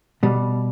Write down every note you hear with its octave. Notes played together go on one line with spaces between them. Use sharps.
B2 G3